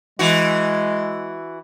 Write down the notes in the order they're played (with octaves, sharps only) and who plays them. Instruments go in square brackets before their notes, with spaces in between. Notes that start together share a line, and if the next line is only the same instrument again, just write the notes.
[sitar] E3 F#4 [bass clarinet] G#3